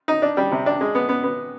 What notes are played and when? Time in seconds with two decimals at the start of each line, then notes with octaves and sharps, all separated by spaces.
0.08 D#4
0.22 D4
0.37 G3
0.51 C3
0.66 D4
0.81 G#3
0.95 B3
1.09 B3
1.23 B3